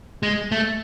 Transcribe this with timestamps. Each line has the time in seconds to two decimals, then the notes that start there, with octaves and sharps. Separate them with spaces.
0.23 G#3
0.52 A3